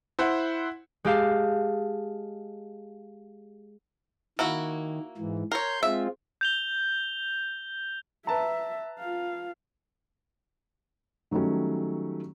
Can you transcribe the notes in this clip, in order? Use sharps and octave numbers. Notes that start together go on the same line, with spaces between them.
E4 C5 F#5
G#3 G4 F5 A5
D#3 A#3 E4 F#4
G#2 E3
A#4 C#5 C6 G6
G#3 C4 F4 E5
G6 F7 G7
B4 E5 A5 A#5
F4 F5
D#3 F#3 G3 A3 C#4